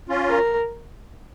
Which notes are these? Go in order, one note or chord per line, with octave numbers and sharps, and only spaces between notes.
C#4 F4
A#4